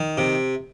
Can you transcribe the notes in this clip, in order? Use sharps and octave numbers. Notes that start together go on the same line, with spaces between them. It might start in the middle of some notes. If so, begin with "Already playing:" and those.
Already playing: D#3
C3